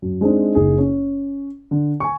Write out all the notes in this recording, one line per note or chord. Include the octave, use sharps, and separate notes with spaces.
F#2
G#3 C4 D4 D#4
F#1 D#4 G#4
C#4
D3
G#5 C#6